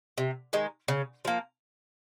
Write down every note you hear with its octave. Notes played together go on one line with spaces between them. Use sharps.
C3
D#3 G#3
C#3
F3 A#3